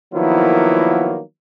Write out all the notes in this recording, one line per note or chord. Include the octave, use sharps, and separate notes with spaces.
D#3 F3 F#3 A#3 B3 E4